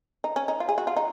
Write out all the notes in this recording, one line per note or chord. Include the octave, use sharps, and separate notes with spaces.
D#4
C#4
D#4
F4
G#4
F#4
F4
D#4